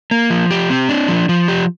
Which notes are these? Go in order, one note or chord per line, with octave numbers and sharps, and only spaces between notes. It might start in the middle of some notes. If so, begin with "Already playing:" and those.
A#3
F3
G4
C4
D4
F3
F3
G4